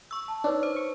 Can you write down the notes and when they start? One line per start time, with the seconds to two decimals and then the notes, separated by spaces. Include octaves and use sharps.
0.11 C#6 E6
0.28 A5
0.44 D4 D#4 B4 C#5
0.63 C5
0.76 C#6